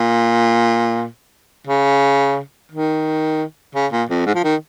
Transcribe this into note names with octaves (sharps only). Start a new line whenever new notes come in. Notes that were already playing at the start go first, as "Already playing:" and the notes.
Already playing: A#2
C#3
D#3
C#3
A#2
F2
G#2
F3
D#3